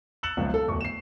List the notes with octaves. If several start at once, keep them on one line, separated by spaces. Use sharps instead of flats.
E6 F#6 A6 C#7 E7 F#7
F#1 C#2 F#2 B2 F3
A4
D1 E2 C#6
C7 E7